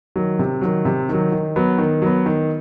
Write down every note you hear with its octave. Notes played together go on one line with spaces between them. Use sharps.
D#3 F#3
C3
D#3 F#3
C3
D#3 F#3
D#3
F#3 B3
D#3
F#3 B3
D#3